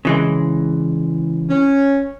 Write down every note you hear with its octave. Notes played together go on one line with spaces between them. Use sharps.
C#3 E3 G#3
C#4